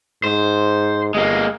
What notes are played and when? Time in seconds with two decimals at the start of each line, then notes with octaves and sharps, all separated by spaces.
0.24 G#2 C5
1.14 G1 G#3 A#3